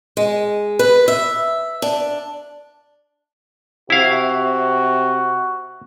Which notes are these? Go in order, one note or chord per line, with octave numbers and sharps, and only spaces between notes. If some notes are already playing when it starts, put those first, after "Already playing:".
G#3
B4
E5
D4
C3 E4 F#4 F5